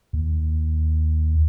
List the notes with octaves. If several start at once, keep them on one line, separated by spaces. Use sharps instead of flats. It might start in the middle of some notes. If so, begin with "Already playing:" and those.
D#2